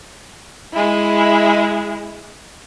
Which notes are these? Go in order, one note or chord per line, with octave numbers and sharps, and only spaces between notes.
G#3 E4